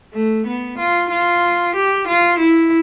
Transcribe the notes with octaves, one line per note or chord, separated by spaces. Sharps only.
A3
B3
F4
F4
G4
F4
E4